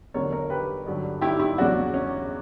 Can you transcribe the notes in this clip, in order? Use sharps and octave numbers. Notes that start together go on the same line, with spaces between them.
E2 D3 F#3 A#4 C#5
A#4 C#5
G4 B4
G2 D3 F#3
E4 G4
E4 G4
E2 C#3 F#3 D4 F#4
C#4